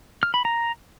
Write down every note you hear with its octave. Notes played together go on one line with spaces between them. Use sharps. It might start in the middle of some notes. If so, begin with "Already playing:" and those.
F6
B5
A#5